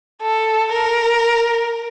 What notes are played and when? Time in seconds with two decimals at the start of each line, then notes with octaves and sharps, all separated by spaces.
0.22 A4
0.72 A#4